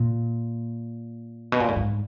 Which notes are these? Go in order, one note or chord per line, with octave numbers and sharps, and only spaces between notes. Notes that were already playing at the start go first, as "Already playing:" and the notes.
Already playing: A#2
B2
A#2
A2
G#2